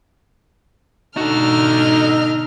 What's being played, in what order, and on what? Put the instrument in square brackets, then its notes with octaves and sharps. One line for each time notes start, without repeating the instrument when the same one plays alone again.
[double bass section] G#2 B2 D3 [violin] D4 F6 [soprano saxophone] D#4 [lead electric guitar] F#4 A4